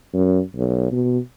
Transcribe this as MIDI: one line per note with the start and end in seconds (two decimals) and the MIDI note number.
0.13 0.40 42
0.56 0.90 35
0.92 1.18 47